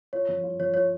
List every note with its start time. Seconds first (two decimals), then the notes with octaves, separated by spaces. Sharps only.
0.13 F4 C#5
0.29 F3
0.44 F4
0.59 F3 C#5
0.74 F4 C#5